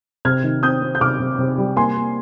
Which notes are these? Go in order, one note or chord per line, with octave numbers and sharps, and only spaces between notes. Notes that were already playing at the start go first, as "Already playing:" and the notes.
C3 F6 G#6
D#3
C4 D#6 G6
C4
G6
C3 D6 F6
C3
C3
G3
A#3 G#5 C6
A#3